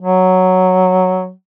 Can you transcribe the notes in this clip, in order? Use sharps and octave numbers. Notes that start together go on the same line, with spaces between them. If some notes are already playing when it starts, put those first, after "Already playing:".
F#3